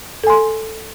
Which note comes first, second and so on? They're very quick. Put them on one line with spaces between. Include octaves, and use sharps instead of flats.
A4 G#5 C6